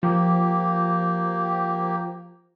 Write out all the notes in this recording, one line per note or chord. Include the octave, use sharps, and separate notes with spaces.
F3 A#3 G4